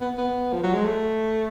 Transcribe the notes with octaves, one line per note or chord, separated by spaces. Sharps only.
B3
B3
F3
F#3
G#3
A3